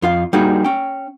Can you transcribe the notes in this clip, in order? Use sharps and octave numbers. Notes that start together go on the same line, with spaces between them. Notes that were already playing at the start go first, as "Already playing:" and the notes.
F2 F4 F5
G3 A#3 D#4 F#4 G#4
C#4 G5